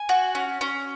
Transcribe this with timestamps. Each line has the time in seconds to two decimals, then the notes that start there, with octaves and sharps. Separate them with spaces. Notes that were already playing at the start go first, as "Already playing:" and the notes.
Already playing: G#5
0.09 F#4
0.35 C#4
0.61 C#4